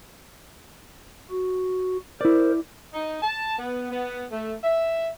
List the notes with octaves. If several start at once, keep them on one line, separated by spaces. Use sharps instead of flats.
F#4
E4 A#4 C5 D5
D#4
A5
B3
B3
A3
E5